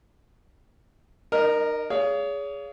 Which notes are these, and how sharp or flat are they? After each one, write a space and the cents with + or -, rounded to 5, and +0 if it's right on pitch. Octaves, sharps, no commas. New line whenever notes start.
D#4 -45 A#4 +0 D#5 +0
G#4 +0 C#5 +35 F5 -15